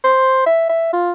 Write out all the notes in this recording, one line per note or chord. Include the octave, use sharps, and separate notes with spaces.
C5
E5
E5
F4